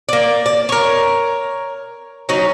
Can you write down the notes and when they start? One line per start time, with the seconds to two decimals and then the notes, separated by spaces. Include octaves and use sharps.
0.09 A#3 D5
0.46 D5
0.69 A#4 C#5
2.29 F#3 C#4 D#4